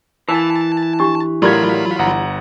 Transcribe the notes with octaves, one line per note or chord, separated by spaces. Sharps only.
E3 A#4 F5 G#5 A5
D4 G4 C#6
A2 F#3 F4 G4 A#4 D5 B5 G#6
G1 F#5 A#5